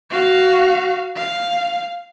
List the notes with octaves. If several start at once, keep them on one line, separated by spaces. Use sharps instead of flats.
F#4 F5
F5